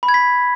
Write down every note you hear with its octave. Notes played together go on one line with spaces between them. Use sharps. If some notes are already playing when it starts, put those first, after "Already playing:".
B5
G#6
B6